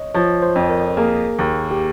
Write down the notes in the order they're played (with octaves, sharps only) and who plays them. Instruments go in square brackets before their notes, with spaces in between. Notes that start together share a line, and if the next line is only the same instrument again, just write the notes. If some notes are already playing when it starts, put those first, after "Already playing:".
Already playing: [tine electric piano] C#5 D#5
[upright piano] F3 [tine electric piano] C#5
[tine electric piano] C5
[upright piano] F2
[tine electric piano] A#4
[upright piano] A#3 [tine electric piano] G#4
[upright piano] D#2
[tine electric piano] G4